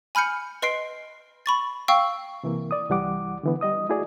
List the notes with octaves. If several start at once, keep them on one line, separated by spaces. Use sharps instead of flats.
G#5 B5 F6 G6 C#7
B4 D#5 C6 C7 D7
B5 C#6 A6
F5 G5 C#6 E6
C3 E3 A#3
D5 D#6
C2 E3 G3 F#5 D6
D3 E3 B3
G3 D#5 D#6
A3 E4 F#4 G#4 D5